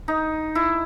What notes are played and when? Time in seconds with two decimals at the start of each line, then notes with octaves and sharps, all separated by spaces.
0.08 D#4
0.55 E4